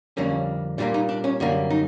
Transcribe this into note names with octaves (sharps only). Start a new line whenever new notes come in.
F2 D3 G3 A#3 C#4
A#2 G3 A#3 D4
D#4
D4
C#4
F#2 D3 G3 A#3
D#4